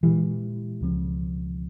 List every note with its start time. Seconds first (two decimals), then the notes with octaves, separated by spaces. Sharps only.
0.03 A#2 E3 G#3 E4 G4
0.81 C#2 C#3 F3 C4